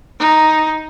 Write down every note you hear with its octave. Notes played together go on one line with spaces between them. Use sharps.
D#4